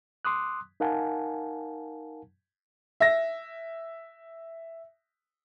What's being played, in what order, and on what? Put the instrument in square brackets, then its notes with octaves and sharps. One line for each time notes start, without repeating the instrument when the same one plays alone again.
[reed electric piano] C6 D6 D#6 F#6
D#4 A#4 F5 F#5 G#5 A5
[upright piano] E5 A#6